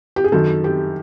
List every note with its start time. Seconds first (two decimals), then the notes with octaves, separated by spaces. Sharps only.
0.16 G4
0.24 G#4
0.32 F#2 D#3 F#3 A4
0.64 G4